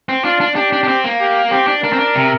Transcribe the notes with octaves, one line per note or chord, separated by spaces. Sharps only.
C4
D4 F4
D4
D4 G4
D4
D4
C4
A#3
G4
C4 G4
D4
D4 A#4
C4
D4
C3